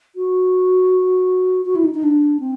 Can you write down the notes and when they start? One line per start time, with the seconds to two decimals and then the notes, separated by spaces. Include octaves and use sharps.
0.16 F#4
1.65 F#4
1.75 E4
1.84 D#4
1.94 D#4
2.03 D4
2.40 C4